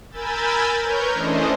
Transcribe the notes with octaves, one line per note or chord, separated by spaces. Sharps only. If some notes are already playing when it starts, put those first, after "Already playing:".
A#4 G#5 B5 E6 G6 A6
A#4 B4 C#5 F6 G6 G#6
E3 A3 C#4 D4 C5 D#5